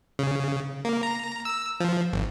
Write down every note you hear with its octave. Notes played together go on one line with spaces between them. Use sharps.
C#3
A#3
A#5
E6
F3
G#1